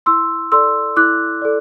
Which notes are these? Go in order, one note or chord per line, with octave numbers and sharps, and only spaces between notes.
E4 C6 E6
A4 D5 C6 E6
E4 D6 F#6
A4 D5